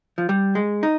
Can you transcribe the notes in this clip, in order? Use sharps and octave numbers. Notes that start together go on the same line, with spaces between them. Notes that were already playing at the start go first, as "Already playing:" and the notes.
F3
G3
G#3
D#4